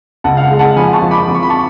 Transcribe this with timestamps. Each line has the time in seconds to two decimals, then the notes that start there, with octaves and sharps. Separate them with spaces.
0.24 C#2 F#5 A5
0.37 F5
0.42 F#5
0.51 G#3
0.59 F#5 A5
0.76 F3 G#5 B5
0.93 A5 C#6
1.02 F3
1.11 B5 D6
1.28 F3 D6
1.35 C#6
1.43 B5
1.50 A5 C#6